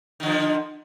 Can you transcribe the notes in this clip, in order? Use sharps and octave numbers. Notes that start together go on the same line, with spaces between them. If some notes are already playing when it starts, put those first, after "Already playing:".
D3 D#3 F3